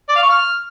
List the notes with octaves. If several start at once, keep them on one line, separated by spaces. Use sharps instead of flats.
D5
F5
C#6
F6